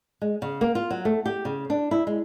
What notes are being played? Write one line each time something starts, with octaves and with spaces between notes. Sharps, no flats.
G#3
C#3
A#3
F4
F#3
A3
G4
C#3
D4
E4
G#3